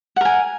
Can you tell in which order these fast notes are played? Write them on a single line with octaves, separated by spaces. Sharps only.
F#5 A#4 G#5